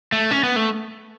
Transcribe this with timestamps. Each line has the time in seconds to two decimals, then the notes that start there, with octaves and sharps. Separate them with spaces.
0.12 A3
0.31 C#4
0.43 B3
0.56 A3